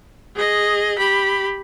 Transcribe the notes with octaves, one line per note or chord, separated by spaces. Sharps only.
G#4 D#5
G4 B5